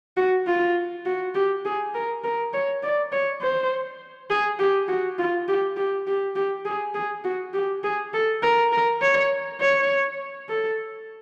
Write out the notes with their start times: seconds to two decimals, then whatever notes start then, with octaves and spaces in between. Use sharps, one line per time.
0.17 F#4
0.47 F4
1.06 F#4
1.35 G4
1.65 G#4
1.95 A#4
2.24 A#4
2.53 C#5
2.83 D5
3.12 C#5
3.41 C5
4.30 G#4
4.59 G4
4.88 F#4
5.19 F4
5.48 G4
5.77 G4
6.07 G4
6.36 G4
6.65 G#4
6.94 G#4
7.24 F#4
7.54 G4
7.84 G#4
8.14 A4
8.43 A#4
8.73 A#4
9.01 C#5
9.60 C#5
10.49 A4